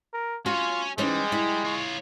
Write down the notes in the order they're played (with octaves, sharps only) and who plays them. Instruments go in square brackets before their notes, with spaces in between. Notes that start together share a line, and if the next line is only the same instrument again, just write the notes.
[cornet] A#4
[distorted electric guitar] C#4 C#5 [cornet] F4 [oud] F#4
[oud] E3 C#4 D#4 [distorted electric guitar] G3 [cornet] G#3
[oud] E4
[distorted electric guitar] F4 C#5